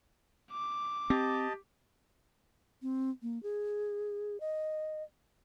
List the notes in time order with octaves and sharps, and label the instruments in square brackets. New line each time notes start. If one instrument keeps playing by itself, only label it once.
[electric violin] D6
[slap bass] C4 [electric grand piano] G4 [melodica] D#5 A5
[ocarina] C4
A#3
G#4
D#5